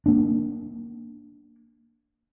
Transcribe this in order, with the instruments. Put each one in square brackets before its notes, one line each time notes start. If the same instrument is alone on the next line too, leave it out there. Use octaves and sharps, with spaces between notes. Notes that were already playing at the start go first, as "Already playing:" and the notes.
[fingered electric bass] A#3 D4